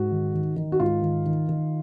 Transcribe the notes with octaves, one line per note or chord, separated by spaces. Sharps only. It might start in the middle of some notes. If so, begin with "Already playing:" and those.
Already playing: G#2 F#4
D#3
D#3
D#3
F#4
G#2 F4
D#3
D#3
D#3